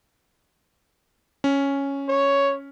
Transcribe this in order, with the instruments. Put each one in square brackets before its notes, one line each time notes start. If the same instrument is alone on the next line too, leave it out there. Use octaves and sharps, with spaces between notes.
[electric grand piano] C#4
[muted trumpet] C#5